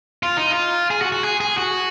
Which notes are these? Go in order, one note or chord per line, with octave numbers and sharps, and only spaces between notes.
F4
D#4
F4
G#4
F#4
F#4
G#4
G#4
F#4